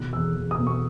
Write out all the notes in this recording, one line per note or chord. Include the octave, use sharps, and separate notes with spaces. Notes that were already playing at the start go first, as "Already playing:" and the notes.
Already playing: B2 D#3 F#6
E2 E6
E2
D#6
B2
C#6